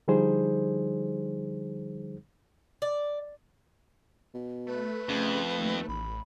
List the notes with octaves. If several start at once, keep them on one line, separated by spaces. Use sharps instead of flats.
D3 F3 G3 D#4 G#4 C5
D5
B2
A3 B4
F2 C#3
D#2
A1 B5